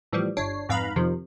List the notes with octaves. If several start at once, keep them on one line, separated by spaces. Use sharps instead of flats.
A2 E3 F3 G3
G1 D4 C#5 C7
F2 G#2 B4 F5 A#5 B5
F2 C3 D#3 F3